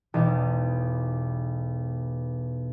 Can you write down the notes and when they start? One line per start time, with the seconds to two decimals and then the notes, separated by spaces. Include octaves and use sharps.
0.14 E1 B1